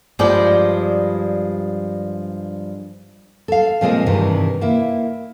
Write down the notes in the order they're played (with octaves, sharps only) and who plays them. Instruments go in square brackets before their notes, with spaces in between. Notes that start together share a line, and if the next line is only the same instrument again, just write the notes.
[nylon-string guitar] G2 F3 G3 G#3 D5 G5
A4 F5
A#2 F3 G#3 C4 G#4 D#5
G2 C3 D#3 E3
A#3 E4